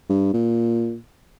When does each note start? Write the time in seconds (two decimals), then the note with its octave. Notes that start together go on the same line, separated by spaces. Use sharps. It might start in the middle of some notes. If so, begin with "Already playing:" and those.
0.09 G2
0.33 A#2